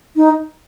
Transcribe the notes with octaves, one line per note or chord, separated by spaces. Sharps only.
D#4